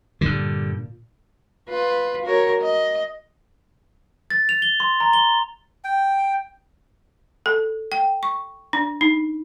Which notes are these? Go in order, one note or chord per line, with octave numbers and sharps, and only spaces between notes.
G2 A#2 D3
F4 B4
F#4 A#4 C#5
D#5
A6
F7
G7
C6
A#5
G7
G5
A4
G5
C#6
D4
D#4